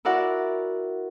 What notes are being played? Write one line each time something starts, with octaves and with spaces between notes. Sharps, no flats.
E4 F#4 A#4 D5 E5 F#5